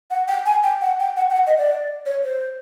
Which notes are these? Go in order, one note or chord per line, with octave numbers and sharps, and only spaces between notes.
F#5
G5
G#5
G5
F#5
G5
F#5
G5
F#5
D#5
D5
C#5
C5